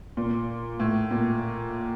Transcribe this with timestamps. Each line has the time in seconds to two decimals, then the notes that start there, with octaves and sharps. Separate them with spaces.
0.17 A#2
0.80 A2
1.11 A#2